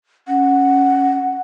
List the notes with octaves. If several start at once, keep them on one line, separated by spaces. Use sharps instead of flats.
C#4 F#5